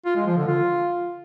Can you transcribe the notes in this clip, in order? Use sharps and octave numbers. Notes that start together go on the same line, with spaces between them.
F4
G#3
F3
D3
F4